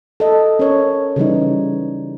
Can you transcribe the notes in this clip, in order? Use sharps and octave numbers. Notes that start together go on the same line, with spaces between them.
A4 D#5
C#4 A#4 C#5
C#3 E3 G3 D#4